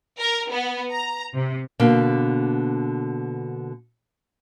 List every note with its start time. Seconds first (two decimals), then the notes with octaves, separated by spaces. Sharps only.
0.19 A#4
0.51 B3
0.91 A#5
1.35 C3
1.79 B2 D3 A#3